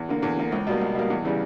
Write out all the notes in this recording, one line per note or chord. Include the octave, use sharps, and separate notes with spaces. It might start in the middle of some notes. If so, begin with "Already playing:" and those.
Already playing: E2
D3 A#3
E2
D3 A#3
C#2
B2 G3 A#3
C#2
B2 G3 A#3
E2
C#3 E3 G3